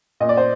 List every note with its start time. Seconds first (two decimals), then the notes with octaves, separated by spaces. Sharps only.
0.20 A#2 D#5
0.29 D5
0.37 C5